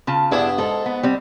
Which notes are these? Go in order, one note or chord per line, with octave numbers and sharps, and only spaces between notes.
C#3 F4 A5
G2 B3 D4 E4 G#4
G#2 A4
B3
G3 C4